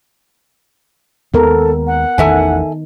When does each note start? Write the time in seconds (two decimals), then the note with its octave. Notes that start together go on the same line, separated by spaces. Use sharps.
1.34 D#2 D#3 G#3 B3 A4 A#4
1.87 F#5
2.18 A1 E2 D#3 A4 E5 G#5